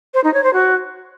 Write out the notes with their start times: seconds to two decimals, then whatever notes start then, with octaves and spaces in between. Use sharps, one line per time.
0.14 C5
0.24 D#4
0.34 C#5
0.44 C5
0.54 F#4